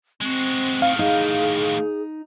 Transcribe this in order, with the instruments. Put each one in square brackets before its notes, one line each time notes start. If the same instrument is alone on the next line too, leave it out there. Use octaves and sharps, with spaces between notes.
[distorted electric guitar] G#3 F#4 [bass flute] C4
[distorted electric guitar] A2 D#3 [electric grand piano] F5
[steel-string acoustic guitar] D#4 [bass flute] G#4